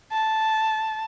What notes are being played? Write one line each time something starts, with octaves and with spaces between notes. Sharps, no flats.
A5